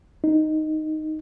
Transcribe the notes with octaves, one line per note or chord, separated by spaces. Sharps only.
D#4